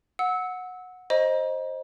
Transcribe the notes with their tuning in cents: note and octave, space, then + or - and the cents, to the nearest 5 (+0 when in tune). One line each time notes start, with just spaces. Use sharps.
F#5 -15 E6 -25
C5 +15 D#5 +0 A#5 +40